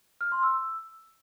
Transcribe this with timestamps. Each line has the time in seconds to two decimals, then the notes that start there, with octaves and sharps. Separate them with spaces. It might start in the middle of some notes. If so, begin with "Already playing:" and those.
0.21 F6
0.32 C6
0.43 E6